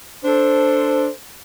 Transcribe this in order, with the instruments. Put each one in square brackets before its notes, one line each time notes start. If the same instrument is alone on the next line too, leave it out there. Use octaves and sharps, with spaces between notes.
[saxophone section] D4 A4 C5